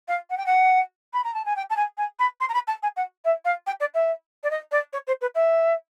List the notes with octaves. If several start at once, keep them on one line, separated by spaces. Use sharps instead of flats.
F5
F#5
G5
F#5
B5
A#5
A5
G#5
G5
A5
G#5
G#5
B5
C6
A#5
B5
A5
G#5
F#5
E5
F5
G5
D5
E5
D5
D#5
D5
C#5
C5
B4
E5